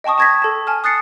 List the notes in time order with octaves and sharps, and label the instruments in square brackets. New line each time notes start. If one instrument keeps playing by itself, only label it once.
[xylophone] D#5 G5 A5 C#6 D#6
A5 C#6 G#6 A#6 B6
A4 A5
G#5 A5 F6
D#6 F#6 A6 C7 C#7